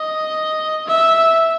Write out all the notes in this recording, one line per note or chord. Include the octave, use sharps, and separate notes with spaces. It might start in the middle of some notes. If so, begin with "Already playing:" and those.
Already playing: D#5
E5